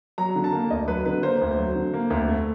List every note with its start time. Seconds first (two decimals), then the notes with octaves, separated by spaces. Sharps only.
0.18 F#3 A#5
0.36 D3
0.44 A5
0.52 A#3
0.70 D2 D#5
0.88 F#3 B4
1.05 D3 B4
1.23 A#3 C5
1.41 D2
1.59 F#3
1.76 D3
1.94 A#3
2.10 D2
2.28 A3